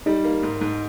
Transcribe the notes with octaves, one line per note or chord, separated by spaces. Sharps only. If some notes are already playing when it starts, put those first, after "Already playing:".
G3 D#4
A#3
G#2
G#2